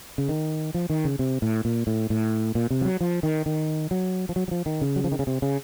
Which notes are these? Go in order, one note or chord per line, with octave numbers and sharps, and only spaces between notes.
C#3
D#3
F3
D#3
C#3
C3
A2
A#2
A2
A2
A#2
C3
F3
F#3
F3
D#3
D#3
F#3
F3
F#3
F#3
F3
D#3
C#3
F#3
F3
D#3
C#3
C3
C#3